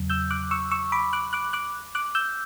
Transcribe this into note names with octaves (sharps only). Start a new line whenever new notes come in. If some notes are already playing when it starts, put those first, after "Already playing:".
Already playing: E2 C#3 F#3
E6 G6
D6 F#6
C#6 E6
C#6 E6
B5 D6
D6 F#6
D6 F#6
D6 F#6
D6 F#6
E6 G6